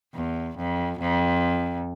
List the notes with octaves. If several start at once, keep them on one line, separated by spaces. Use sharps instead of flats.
E2
F2
F2